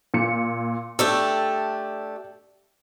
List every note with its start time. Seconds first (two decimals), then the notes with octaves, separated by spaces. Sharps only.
0.14 A#2 C#7
0.99 A3 D4 G4 E6